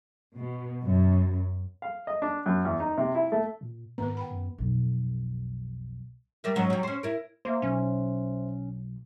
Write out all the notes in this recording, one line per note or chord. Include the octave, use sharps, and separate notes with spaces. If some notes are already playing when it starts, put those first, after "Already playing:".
B2
F#2
F5
D#5
D4
F#2
E2
D#4
C3
E4
A3
A#2
G#2 D#3 B3 B4
G5 B5
F#2
B1 F2
G3 A#4 E5
G#2 F#3 C#4
F#3 G3
C#4 C5
E4 A#4
A#3 C5 E5
B1 C#4